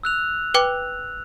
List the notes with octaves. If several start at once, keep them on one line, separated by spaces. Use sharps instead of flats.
E6 F#6 F7
B4 G5 D6